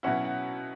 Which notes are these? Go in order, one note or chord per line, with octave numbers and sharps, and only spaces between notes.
B2 F#3 C#4 E4 F#5
F#5